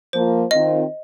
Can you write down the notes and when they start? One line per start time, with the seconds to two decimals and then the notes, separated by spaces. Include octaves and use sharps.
0.13 F3 A#3 F4 C5
0.51 D#3 C4 F4 D#5